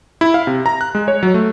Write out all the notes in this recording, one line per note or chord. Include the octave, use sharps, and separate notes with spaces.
E4
F5
C3
A#5
F#6
G#3
C#5
F#3
A3